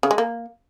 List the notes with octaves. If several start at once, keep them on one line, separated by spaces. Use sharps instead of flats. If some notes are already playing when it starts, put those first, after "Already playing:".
C#3
G#3
A#3